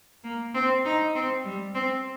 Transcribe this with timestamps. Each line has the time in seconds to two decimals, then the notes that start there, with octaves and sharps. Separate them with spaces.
0.24 A#3
0.55 C4
0.85 D#4
1.15 C4
1.44 G3
1.75 C4